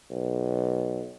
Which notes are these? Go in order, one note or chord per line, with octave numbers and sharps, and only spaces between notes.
B1